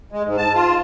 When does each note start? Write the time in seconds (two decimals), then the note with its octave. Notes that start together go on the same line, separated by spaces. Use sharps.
0.12 G#3
0.26 G#2
0.38 A5
0.54 F4